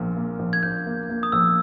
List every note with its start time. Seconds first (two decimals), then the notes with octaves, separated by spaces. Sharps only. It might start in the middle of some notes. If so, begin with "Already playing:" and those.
Already playing: A#1 A#2 A#3
0.17 A#3
0.39 A#1
0.53 G#6
0.63 A#1 G6
0.86 A#3
1.10 A#3
1.23 D#6
1.32 A#1 E6